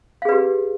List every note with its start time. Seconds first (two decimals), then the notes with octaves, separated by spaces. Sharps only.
0.22 F5
0.25 G#4
0.29 B4
0.32 G4